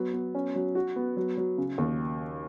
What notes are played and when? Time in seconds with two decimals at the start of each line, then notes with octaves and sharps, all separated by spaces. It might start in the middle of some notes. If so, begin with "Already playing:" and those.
Already playing: F#3 B3
0.14 B3
0.35 C#4
0.56 F#3
0.75 F#4
0.96 B3
1.17 F#3
1.38 F#3
1.58 C#3
1.78 D#2